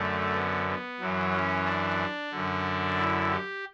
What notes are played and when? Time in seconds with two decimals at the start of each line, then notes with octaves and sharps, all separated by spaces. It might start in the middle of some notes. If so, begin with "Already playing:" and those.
Already playing: F#2 D3 A3
0.35 B3
0.68 B3
1.00 F#2 E3 F#3
1.33 C#4
1.66 D4
2.32 F#2 D3
2.98 E4
3.30 G4